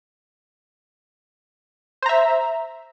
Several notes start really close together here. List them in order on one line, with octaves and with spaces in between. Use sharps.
C5 A#5 E5